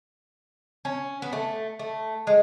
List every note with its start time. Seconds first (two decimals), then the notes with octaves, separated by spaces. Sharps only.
0.85 C#4
1.22 B3
1.33 A3
1.79 A3
2.27 G#3